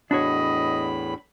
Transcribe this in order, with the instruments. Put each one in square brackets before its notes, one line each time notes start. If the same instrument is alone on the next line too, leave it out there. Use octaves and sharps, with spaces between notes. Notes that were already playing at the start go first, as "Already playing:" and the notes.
[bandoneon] E2 A2 B5 [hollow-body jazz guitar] D4 F#4 C#5 [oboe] D#5